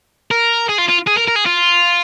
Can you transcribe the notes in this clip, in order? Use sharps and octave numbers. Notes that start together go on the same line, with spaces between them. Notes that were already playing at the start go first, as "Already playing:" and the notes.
A#4
G#4
F4
F4
G#4
A#4
A#4
G#4
F4